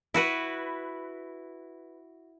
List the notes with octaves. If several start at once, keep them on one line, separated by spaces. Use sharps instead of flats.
E4 F#4 B4